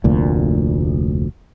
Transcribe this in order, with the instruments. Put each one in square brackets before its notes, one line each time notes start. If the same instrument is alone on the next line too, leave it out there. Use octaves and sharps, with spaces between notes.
[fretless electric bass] F1 D2 A#2